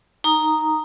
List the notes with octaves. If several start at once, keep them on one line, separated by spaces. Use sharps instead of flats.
D#4 A#5 D#6